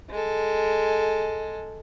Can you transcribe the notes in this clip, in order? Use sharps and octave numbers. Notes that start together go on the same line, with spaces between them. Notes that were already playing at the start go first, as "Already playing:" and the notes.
G#3 A4